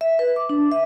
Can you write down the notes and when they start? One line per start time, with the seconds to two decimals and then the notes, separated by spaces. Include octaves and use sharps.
0.01 E5
0.19 B4
0.36 D6
0.49 D4
0.72 E5